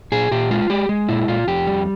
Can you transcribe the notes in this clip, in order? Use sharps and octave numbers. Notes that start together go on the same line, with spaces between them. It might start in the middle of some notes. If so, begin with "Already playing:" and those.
A#2 G#4
A#2 G4
G#3 F4
G#3 G4
G#3
A#2 E4
A#2 F4
F2 G4
G3